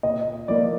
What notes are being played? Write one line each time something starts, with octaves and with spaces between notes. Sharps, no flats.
A#2 D#5
F3 A#3 D5